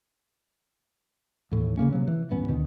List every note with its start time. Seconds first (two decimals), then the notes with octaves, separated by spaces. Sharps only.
1.51 D#2 A2 E3
1.77 C#3 F3 A#3 C#4
1.93 C3 F#3
2.07 E3
2.30 D1 G2 B3 C#4
2.48 D2 B2 D#3